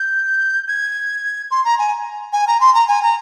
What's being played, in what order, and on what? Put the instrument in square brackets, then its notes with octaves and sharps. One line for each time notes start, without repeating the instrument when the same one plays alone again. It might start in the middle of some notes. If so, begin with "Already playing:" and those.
Already playing: [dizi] G6
G#6
C6
A#5
G#5
G#5
A#5
C6
A#5
G#5
A#5